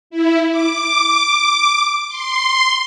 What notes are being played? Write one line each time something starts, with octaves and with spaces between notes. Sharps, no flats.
E4
D6
C6